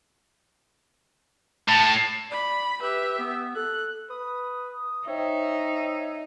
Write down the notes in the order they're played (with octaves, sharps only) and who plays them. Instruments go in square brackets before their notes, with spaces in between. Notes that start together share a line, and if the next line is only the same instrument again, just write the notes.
[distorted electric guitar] A2 [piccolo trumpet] A5
[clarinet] D5 [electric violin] B5
[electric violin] G4 E5 [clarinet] B4
[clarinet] B3
[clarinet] A4 [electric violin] F#6
[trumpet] B4 [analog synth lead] D#6
[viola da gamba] D#4 [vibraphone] C5 G5 [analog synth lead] C#5 [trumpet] E5